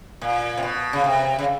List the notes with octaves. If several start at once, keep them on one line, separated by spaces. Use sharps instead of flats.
A#2
C3
B2
C#3
C3
C#3